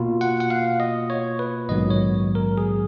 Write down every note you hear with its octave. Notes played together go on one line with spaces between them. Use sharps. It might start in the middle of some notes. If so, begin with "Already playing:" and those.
Already playing: B2 A#3 F4
F#5
F#5
F5
D#5
C#5
B4
A#1 G#2 D#3 F#3 B3 D#5
C#5
A#4
G#4